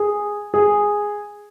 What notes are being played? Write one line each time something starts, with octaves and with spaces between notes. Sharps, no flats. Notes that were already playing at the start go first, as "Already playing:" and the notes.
Already playing: G#4
G#4